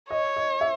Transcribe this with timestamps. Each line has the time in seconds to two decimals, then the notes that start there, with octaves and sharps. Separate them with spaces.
0.11 C#5 D#5
0.36 D#5
0.61 E5